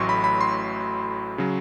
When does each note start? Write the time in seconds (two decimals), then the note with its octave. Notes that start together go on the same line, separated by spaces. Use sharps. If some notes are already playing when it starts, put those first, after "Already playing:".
Already playing: A1 A2 F#3 C6 C#6
0.09 B5
0.24 B5
0.41 C6
1.38 C#3 F#3